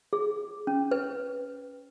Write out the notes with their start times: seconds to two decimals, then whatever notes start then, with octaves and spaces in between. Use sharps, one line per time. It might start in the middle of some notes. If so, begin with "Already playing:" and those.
0.13 G#4
0.67 C#4
0.91 B4